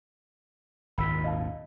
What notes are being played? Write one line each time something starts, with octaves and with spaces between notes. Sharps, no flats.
G#1 D#2 A#2 B5 E6 B6
D#5 F5 A5